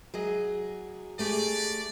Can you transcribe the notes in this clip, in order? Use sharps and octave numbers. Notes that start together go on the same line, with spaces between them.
F#3 G#4 D#5
A3 G4 G#4 D5